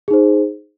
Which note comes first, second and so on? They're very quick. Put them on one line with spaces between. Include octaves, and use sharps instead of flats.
G#4 D#4 C5